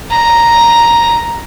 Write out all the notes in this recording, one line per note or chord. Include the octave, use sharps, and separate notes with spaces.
A#5